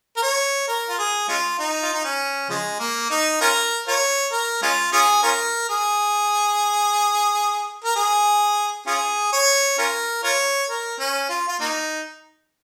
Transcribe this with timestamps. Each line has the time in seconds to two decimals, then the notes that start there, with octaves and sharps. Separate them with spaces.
0.17 A#4
0.23 C#5
0.68 A#4
0.89 F4
0.99 G#4
1.28 G#3 C#4 F4
1.59 D#4
1.82 F4
1.94 D#4
2.05 C#4
2.49 C#3 F3 G#3
2.80 A#3
3.10 D#4
3.41 C#4 F4 A#4
3.87 F4 A#4 C#5
4.32 A#4
4.62 G#3 C#4 F4
4.92 C#4 F4 G#4
5.23 C#4 F4 A#4
5.69 G#4
7.84 A#4
7.96 G#4
8.87 C#4 F4 G#4
9.33 C#5
9.78 C#4 F4 A#4
10.24 F4 A#4 C#5
10.69 A#4
11.00 C#4
11.29 F4
11.48 F4
11.60 A#3 D#4